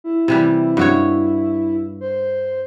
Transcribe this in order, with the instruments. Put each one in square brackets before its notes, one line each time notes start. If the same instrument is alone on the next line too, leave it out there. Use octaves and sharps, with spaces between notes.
[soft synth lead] E4
[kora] C3 E3 G3
G2 F#4 C#5
[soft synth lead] C5